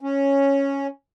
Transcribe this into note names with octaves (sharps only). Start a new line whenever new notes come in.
C#4